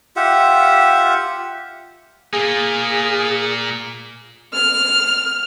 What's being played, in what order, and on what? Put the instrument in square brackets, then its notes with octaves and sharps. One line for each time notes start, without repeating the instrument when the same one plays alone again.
[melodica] F4 G4 E5 F#5
[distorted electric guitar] A#2 A#3 [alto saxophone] G#4
[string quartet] F6